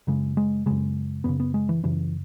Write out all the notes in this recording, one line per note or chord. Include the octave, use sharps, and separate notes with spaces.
F#2 C#3 G#3
G#3
F#2 C#3 G#3
F#2 C#3 B3
B3
G#3
E3
F#2 C#3 E3